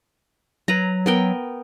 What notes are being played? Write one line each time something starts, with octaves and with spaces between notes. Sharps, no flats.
F#3 B4 A#5
B3 A#4 G5